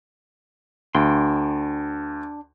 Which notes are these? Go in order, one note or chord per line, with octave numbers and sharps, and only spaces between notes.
D2 D4 G5 C6